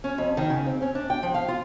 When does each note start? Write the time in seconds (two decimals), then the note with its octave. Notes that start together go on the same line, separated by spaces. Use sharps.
0.04 C#4
0.18 F2
0.37 D#3
0.50 C#3
0.66 C4
0.82 C#4
0.95 D4
1.10 G5
1.23 F3
1.34 F5
1.48 F4